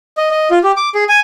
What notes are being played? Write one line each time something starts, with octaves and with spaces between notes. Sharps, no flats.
D#5
D#5
F4
G4
D6
G#4
G#5